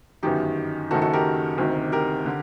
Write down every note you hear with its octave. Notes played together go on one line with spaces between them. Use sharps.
G1 F#2 D#3 D#4 G4
F#1 F#2 D#3 F#4 A4
F#4 A4
G4 A#4
D2 C3 D#3
G4 A#4
D3